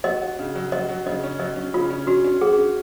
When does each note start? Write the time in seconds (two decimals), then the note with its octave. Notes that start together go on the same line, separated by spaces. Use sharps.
0.04 F#4 D#5
0.22 F#4
0.39 C#3
0.55 F#3
0.72 F#4 D#5
0.89 F#3
1.06 C#3 D#5
1.24 C#4
1.39 F#3 D#5
1.56 C#4
1.74 C#3 F4
1.91 C#4
2.07 C#4 F#4
2.24 C#4
2.41 F#4 G#4
2.58 C#4